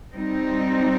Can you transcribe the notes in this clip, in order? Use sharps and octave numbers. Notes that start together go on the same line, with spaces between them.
G3 C4 D#4